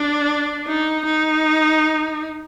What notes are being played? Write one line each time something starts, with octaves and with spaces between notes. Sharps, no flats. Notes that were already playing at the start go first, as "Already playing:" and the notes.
Already playing: D4
D#4
D#4